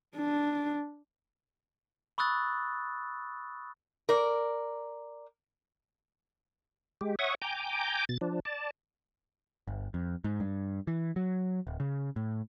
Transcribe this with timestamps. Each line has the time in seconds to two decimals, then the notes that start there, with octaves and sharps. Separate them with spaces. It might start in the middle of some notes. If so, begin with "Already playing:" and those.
0.16 D4
2.18 B5 C#6 D#6 E6 F#6 A6
4.09 A#4 D5
7.01 G#3 G4
7.19 C#5 E5 F#5 C#6 D#6
7.42 G5 G#5 A#5 D6 G6
8.09 B2 A6
8.21 F3 D4
8.45 D5 A5
9.68 G1
9.94 F2
10.24 G#2
10.40 G2
10.87 E3
11.16 F#3
11.67 D1
11.80 C#3
12.16 A2